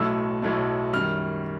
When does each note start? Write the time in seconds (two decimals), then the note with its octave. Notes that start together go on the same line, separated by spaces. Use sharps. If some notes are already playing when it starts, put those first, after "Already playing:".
Already playing: B1 A2 F#3 A3 E6
0.42 B1 A2 F#3 A3
0.93 F#2 D#3 G3 F6